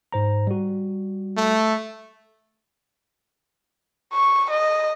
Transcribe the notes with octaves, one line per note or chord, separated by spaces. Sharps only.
G#2 C5 A#5
G3 F#4
A3
C#6
D#5